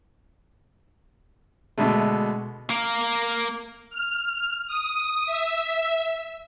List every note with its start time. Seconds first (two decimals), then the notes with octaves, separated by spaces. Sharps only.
1.78 B2 D3 G#3 A3
2.70 A#3 A#4
3.90 F6
4.67 D#6
5.26 E5